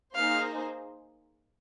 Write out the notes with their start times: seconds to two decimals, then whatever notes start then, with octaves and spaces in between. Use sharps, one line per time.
0.15 A#3 D#4 G#4 C5 F5